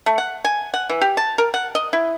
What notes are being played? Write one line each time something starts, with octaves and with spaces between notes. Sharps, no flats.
A3
F#5
G#5
F#5
E3
G4
A5
A#4
F#5
D#5
E4